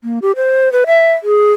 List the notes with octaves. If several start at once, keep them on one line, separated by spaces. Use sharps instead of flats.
A#3
G4
C5
B4
E5
G#4